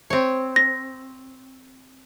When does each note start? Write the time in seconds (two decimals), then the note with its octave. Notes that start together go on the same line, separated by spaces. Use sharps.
0.10 C4 C#5
0.56 A#6